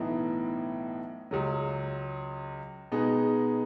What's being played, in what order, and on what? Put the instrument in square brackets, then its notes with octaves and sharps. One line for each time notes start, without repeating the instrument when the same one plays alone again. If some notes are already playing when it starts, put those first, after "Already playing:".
Already playing: [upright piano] B1 A2 E3 B3 D#4
C#2 C#3 F#3
B2 G#3 B3 D#4 G#4